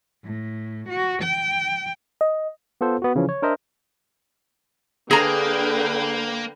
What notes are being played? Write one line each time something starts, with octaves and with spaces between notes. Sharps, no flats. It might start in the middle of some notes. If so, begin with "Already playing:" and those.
A2
F#4
G5
D#5
B3 F4 A4 C5
B3 F#4
C#3 E3 F3 C#4
C#5
D4 A#4 C5 D#5 E5
D3 A#3 G#4 B4 G5 A#5